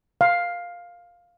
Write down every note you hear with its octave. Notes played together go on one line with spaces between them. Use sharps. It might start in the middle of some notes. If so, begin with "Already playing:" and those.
F5